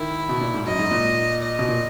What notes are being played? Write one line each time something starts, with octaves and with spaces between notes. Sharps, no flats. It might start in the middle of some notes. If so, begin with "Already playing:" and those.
Already playing: D#3 E4
B2
A#2
G#2
F#2 D#5
G#2
A#2
D#5
B2
A#2